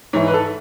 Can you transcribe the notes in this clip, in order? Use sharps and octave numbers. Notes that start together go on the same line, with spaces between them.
G#2 E3 C#5
B4
A4